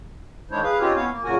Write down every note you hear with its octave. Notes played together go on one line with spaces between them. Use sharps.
D#3 G#3 D4 E4 C5 C#5
G#4 B4 F5
C4 C#4 D#4 F4 G4 C#5
B3 C#4 E4 C#5 F5
A#3
F#2 A#2 C#3 F#4 A#4 G#5